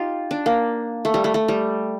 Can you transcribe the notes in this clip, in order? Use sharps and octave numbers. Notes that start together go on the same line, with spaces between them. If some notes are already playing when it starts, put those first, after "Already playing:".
Already playing: D#4 F4 G4
D4
A#3
A3
G3
A3
A3
G3